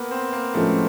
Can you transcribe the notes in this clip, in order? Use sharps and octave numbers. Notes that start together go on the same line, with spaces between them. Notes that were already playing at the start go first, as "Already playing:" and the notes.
Already playing: A#3 B3
C4
A#3
A2 F3 G#3 A3 C#4 F4